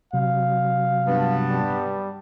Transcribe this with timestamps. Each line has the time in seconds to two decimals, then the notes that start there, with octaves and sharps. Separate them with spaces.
0.13 C3 F#3 F5
1.07 G2 B3 A5
1.47 G3